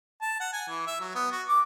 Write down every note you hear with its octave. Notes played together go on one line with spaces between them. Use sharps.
A5
F#5
G#5
E3
E5
F#3
B3
F#4
D6